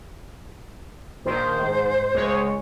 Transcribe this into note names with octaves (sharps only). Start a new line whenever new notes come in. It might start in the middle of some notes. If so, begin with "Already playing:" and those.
A#1 D#3 C5
G#2
C#2 G#3 C#5